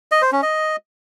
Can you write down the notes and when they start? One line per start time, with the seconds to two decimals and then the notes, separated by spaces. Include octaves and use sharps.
0.12 D#5
0.22 C5
0.32 C#4
0.43 D#5